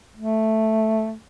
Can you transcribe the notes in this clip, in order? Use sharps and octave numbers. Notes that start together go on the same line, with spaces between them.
A3